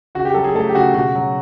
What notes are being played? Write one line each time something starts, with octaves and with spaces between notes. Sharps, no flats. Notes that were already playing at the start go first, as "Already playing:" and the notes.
C#3 F#4
G4
F#3 A4
G#4
A3 A4
G4
C#3 F#4
B2 F#4
F#3